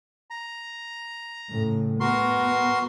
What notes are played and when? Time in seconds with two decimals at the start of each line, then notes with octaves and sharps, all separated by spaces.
0.30 A#5
1.50 A2 C#3
2.00 B3 F#4 A#4 C6